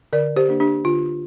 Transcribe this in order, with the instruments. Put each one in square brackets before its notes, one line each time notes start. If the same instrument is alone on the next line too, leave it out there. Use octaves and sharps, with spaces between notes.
[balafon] D3 A#4 D5
G4 C5
A#3 D4
D4 G4
D3 F4